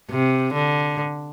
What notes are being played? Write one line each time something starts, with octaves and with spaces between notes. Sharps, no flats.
C3
D3